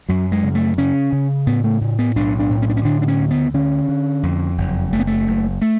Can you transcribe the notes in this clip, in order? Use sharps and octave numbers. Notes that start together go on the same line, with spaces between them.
F#2 F#3
G#3
C#3
A3
C#3 C#4
C#3
A2 B3
A3
A2
B3
B1 D4
D4
A2
C#4
D4
C#4
D3 D4
D4
C#4
D2
B3
D3 C#4
D3
F2
F#1
F#1 A3
B3
A3
F#1
A3